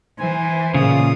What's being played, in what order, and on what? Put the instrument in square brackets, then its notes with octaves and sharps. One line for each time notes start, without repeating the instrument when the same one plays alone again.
[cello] E3 [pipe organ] C5 G#5
[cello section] A#2 F4 G#4 [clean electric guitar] C#3 [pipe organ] D#6